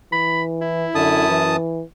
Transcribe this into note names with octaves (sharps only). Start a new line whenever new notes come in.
E3 B5
E4
F#2 D3 A5 D#6
E3